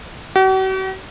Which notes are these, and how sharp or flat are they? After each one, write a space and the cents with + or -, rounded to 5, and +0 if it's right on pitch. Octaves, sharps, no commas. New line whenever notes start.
F#4 +45